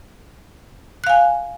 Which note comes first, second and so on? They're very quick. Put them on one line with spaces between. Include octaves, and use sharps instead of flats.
F#6 F5 G#5